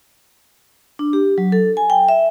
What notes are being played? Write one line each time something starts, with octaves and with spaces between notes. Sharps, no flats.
D4
G4
F#3
A4
G#5
G5
E5